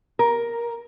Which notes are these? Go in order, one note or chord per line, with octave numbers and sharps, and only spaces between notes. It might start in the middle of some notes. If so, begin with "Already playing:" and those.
A#4